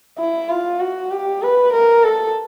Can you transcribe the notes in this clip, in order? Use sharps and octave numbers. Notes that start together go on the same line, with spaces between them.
E4
F4
F#4
G4
B4
A#4
A4